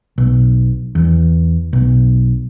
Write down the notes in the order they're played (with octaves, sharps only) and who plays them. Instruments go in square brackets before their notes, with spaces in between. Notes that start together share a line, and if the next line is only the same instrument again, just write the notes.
[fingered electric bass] B1
E2
B1